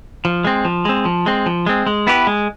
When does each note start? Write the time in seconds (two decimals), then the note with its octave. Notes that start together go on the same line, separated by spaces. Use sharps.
0.25 F3
0.44 G#3 C4
0.65 F3
0.85 G#3 C4
1.05 F3
1.26 G#3 C4
1.46 F3
1.66 G#3 C4
1.87 G#3
2.07 B3 E4 G4 B4
2.27 G#3